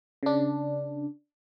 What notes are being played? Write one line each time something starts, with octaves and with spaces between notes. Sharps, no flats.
C#3 D4